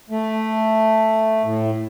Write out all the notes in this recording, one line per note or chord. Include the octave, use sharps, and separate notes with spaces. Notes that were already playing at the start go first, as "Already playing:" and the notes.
A3
A2